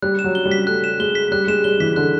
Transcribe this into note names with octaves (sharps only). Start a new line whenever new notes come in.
G3 F#6
E7
F#3
G7
G3
B6
A3 F#6
E7
G#3 G7
B6
G3 F#6
G#3 E7
G3 G7
E3 B6
D3 F#6